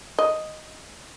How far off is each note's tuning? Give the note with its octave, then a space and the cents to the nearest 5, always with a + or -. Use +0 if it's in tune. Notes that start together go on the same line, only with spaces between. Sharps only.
D#5 +0